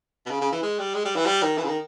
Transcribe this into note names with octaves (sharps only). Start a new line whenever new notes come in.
B2
C#3
C#3
E3
G#3
G3
G#3
G3
E3
G3
D#3
E3
C#3
D#3